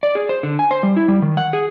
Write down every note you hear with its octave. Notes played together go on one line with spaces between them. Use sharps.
D5
G#4
C5
D3
G#5
C5
G3
E4
G3
D#3
F#5
G#4